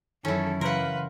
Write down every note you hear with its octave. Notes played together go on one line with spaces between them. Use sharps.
F#2 D#3 E3 C#4 E4 A4
C#3 E3 A#4 B4 F5 F#5 C6